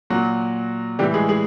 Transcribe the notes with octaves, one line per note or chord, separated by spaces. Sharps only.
A#2 F#3 F#4
A2 E3 G3 G4
G#3 G#4
G#3 G#4